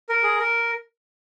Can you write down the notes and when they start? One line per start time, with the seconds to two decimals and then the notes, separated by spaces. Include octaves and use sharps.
0.09 A#4
0.23 G#4
0.39 A#4